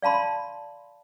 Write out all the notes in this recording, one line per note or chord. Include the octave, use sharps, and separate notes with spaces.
D5 F5 A5 B5 C6